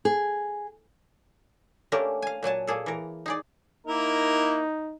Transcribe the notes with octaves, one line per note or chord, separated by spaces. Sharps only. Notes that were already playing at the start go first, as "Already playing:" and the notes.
G#4
A3 A#3 C#4 D4 G4 A#4
F5 G#5
A#2 F#3 G#5 A5
A#2 A#3 G#4 A4
E3 A#4
D#4 G#4 D5
A#3 D#4 E4 A#4